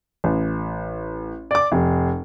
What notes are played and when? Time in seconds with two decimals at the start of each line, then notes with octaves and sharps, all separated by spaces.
0.24 A1
1.51 D5 D6
1.72 F1